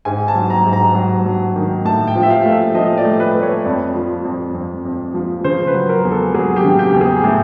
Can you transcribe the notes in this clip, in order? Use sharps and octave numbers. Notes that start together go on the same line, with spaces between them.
G#2 G#5
A5
F#3
A#5
G#2
A#5
F#3
F#3
D#3
A2 A5
G5
F3
E5
F5
A3
E5
F3 D#5
D5
A3
B4
A3
C#5
F2 D5
F3
F2
F2
F2
F3
C#3 C5
B4
F#3
A#4
E2
A4
F#3 G#4
G4
C#3
G4
E2
G#4
A2